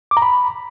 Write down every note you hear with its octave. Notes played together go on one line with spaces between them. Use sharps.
D6
A#5
B5